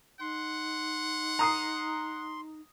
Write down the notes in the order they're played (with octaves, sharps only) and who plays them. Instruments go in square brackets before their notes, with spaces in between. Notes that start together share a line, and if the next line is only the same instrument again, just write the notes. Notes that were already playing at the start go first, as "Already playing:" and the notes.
[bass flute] D#4 [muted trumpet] F#5 [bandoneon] C6
[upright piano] A#5 D#6 C7